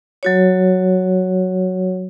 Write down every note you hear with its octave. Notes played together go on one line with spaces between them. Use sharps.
F#3 F#4 C#5